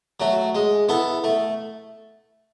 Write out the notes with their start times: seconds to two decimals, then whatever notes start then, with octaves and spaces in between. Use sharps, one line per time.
0.20 F#3 A3
0.55 G#3
0.89 B3 E4 A4
1.24 A3